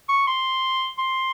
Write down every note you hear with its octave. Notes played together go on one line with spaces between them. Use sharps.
C#6
C6
C6